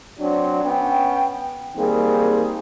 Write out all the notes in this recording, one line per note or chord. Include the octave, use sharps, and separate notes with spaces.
F#3 C4 D4
B3 C#4 G5
D#3 G3 A#3 C4 G#4